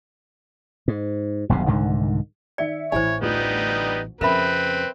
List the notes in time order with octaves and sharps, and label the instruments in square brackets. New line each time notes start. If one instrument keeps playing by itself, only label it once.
[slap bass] G#2
D#1 B1 G2 C3
C2 G#2 D3 D#3
[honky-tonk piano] D#3 E5 C#7 [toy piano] D5
[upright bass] A1 E3 [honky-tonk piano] E4 [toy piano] C5 G#5 [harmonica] C#5
[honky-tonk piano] D2 F4 [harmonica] G3 B3 D#4
[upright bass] F2 C#3 [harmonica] C4 B4 [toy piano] A#4 E5 B5 [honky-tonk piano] E7